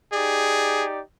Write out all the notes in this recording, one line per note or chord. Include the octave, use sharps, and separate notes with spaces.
D#4 G4 G#4 D5